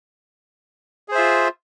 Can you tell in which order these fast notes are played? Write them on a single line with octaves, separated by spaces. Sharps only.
G#4 C5 E5 F4